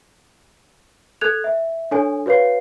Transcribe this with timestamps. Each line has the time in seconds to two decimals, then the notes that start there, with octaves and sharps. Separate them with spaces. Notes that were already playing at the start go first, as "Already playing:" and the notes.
1.21 A4 F#6 G#6 F7
1.44 E5
1.91 D4 A4 C#5 G#5
2.26 F#4 B4 C#5 F5 C7